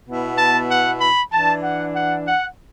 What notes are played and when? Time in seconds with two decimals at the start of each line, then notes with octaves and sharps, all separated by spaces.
0.08 B2 B3 E4
0.38 A5
0.71 F#5
1.01 B5
1.32 E3 D4 A5
1.64 F#5
1.95 F#5
2.27 F#5